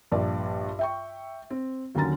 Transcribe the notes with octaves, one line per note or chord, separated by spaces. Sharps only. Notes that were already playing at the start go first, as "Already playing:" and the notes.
A#1 G2 D5
E5 G5 C#6
C4
D#2 D3 F#3 C#4 A#5 A6